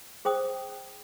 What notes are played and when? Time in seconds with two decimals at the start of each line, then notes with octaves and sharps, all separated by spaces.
0.25 G#4 C5 G5 D#6